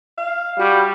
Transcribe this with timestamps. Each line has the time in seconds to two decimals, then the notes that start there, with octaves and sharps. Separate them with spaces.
0.17 F5
0.59 G3 F#4